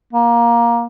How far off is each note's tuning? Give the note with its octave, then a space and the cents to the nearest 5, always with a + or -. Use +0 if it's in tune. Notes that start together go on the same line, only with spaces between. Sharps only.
A#3 +15